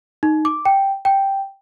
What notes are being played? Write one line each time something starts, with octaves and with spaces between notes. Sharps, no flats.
D#4
D6
G5
G5